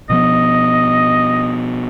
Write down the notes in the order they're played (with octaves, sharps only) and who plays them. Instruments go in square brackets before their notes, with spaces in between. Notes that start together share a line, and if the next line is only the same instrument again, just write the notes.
[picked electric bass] B2 F3 B3 [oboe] D#5